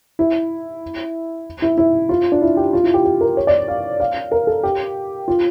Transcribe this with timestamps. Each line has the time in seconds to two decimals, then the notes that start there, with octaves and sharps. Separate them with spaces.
0.19 E4
1.62 E4
1.78 E4
2.09 F4
2.32 D4
2.42 E4
2.57 G4
2.73 F4
2.84 E4
2.94 G4
3.05 G4
3.21 A#4
3.37 C#5
3.47 D5
3.68 F5
4.00 F5
4.32 A#4
4.47 A4
4.63 G4
5.28 F4